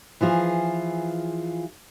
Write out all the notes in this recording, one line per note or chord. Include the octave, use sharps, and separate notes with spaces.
E3 F3 F4 G#4